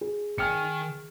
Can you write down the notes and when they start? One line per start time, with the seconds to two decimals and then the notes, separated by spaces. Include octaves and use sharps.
0.01 G#4
0.38 D#3 G5 G#5 F6 C#7